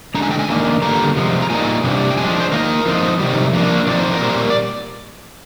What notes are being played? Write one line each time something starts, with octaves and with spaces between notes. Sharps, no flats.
D3 G#3 D4 A#5
G#5
G5
G#5
D#3 A#3 D4
D3 G3 A#3 A#5
C3 F3 G#3
A#5
A#2 G3 A#3 D#4 G#5
C3 G3 D4
G5
F3 G#3 D4 G#5
C5
D#3 A#3 D#4 A#4
F3 C4 D#4
C3 D#3 G3
F3 A#3 D4
F3 C4 D#4 D5
C5
A#4
A#2 G3 A#3 C5
D5